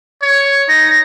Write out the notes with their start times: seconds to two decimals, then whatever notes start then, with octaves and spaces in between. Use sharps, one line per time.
0.22 C#5
0.69 D#4 A#6